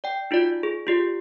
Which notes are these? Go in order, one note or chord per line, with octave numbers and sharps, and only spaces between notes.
D5 G5
D#4 F4 F#4 D5
G#4
F4 G4 D5